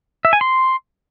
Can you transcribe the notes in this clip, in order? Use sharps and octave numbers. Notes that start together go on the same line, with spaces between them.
E5
G#5
C6